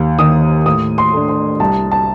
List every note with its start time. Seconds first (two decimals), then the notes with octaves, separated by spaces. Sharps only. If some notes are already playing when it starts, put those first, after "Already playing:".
Already playing: D#2
0.19 D#3 A#3 D#6
0.66 A2 D#6
0.98 C6
1.13 A3 D4
1.29 C6
1.60 C2 A5
1.92 A5